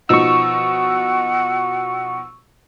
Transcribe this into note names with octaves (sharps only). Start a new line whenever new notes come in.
B2 F3 D#4 F#5 C#6 E6